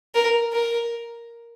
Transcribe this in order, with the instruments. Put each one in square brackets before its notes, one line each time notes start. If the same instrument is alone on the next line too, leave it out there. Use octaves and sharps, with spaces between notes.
[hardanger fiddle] A#4
A#4